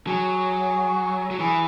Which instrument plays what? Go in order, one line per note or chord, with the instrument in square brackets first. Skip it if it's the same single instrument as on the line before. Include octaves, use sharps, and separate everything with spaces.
[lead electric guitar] F#3 [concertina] G#4
[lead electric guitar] F#3
[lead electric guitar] E3 [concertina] G#4